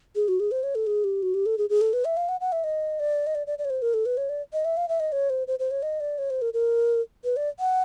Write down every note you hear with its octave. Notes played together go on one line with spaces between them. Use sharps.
G#4
F#4
G#4
C5
C#5
A4
G#4
G4
F#4
G4
A4
G#4
G#4
A4
B4
E5
F5
F#5
F#5
E5
D#5
D5
D#5
D5
D5
D5
C#5
C5
A#4
A4
B4
C#5
D5
D#5
E5
F5
E5
D#5
C#5
C5
C5
C5
C#5
D#5
D5
C#5
C5
A#4
A#4
B4
D5
F#5